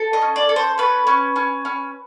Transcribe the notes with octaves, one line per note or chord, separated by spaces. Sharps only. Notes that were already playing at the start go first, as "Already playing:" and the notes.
Already playing: A4
D#5
C#4
D5
A4
C5
C#4 B4
C#4
C#4
C#4